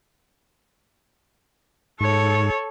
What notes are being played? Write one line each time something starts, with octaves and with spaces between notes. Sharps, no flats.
G#2 A4 C#5